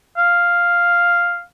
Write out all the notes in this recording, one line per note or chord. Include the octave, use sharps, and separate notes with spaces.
F5